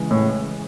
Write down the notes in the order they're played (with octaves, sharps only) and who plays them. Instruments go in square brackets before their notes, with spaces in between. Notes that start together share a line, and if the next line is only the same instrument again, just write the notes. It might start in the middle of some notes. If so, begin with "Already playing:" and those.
Already playing: [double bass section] C#3 E3 G#3
[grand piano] A2